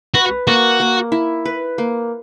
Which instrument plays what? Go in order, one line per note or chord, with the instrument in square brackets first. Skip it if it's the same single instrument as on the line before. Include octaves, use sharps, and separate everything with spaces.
[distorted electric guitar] F#4 [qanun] B4
[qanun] A#3 [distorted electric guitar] F#4
[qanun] A#3
E4
B4
A#3